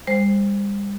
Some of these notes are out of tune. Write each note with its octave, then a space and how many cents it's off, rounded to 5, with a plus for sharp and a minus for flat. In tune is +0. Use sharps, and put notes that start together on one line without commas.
G3 +40 C5 +0